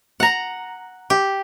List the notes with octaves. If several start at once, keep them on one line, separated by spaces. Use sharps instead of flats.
F#5 A#5
G4